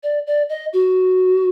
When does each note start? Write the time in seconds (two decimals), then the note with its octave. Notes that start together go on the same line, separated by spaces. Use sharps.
0.03 D5
0.27 D5
0.49 D#5
0.73 F#4